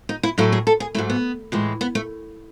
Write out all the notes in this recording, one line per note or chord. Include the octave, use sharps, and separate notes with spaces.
D#4
E4
A2 F#3 A3 E4
G#4
A4
G#4
G#2 F#3 A3 E4
B3
A2 E3 G#3
B3
A3